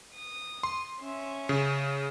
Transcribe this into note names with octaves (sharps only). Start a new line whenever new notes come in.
D#6
C6
C#4 E5
C#3